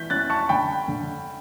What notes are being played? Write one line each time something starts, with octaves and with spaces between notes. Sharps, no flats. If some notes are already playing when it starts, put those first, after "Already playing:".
Already playing: E3 G6 B6
C#4 F#6 A6
A5 C#6
D3 G5 B5
D3